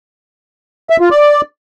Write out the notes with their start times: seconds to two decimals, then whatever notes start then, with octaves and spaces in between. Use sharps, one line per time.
0.90 E5
1.00 F4
1.11 D5